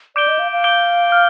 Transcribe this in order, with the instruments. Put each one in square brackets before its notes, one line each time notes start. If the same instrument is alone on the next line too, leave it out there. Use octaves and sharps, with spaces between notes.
[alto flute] D5 [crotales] D6 G6 D7 G7
[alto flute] D#5
F5
F5
[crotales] D6 G6 D7 G7
F6